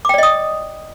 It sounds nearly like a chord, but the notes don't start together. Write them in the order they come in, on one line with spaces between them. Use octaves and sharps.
D6 G5 D5 D#5 D#6